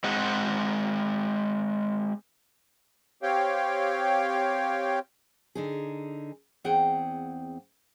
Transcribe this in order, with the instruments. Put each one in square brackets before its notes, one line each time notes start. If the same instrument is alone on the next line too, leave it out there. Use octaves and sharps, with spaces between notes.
[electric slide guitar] G#3 C4 G#4 F#5
[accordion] C4 G4 C#5 F5 G5
[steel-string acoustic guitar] D3 D#4 G#4
E2 C4 G#4 F#5 G5